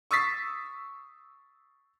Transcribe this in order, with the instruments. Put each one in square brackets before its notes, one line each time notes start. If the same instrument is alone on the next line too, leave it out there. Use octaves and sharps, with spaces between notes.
[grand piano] C#6 D#6 E6 A6 B6 C7